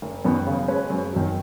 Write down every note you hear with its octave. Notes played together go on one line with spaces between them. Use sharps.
F#1
F#2 D#3 B3
C#3
G#3 C#4 B4
F#2
D#3 F#3